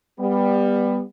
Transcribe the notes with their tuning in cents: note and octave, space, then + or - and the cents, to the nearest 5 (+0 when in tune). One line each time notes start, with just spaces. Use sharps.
G3 +20 B3 +0